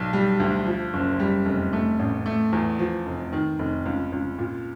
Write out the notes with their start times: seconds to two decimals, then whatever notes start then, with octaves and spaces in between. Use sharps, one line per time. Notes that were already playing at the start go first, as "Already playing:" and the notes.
Already playing: B1
0.13 G3
0.40 D2
0.66 F3
0.93 F#1
1.20 G3
1.46 F1
1.73 A3
1.99 A1
2.26 A3
2.53 E2
2.79 F3
3.06 F1
3.33 D#3
3.59 F1
3.86 C#2
4.12 C#2
4.39 A#2